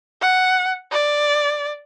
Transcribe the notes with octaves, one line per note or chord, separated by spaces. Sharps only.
F#5
D5